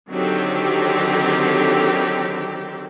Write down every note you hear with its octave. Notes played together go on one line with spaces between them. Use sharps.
D3 D#3 F#3 C4 G4 A4